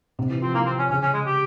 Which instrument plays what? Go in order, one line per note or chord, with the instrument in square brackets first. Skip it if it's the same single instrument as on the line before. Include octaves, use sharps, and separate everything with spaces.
[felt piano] C3
E3
[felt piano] F3 [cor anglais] C4
[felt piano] E3 [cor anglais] A#3
[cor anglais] C4
[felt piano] E3
[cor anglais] C#4
[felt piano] C#3 [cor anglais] C#4
[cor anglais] C#4
G#3
G4